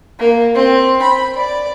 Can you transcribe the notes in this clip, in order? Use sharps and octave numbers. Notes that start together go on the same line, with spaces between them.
A#3
C4
B5
D5